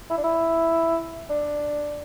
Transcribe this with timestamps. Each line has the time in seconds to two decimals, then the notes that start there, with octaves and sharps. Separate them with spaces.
0.10 E4
0.17 D4
0.24 E4
1.30 D4